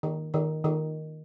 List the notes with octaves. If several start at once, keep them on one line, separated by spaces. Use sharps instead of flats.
D#3
D#3
D#3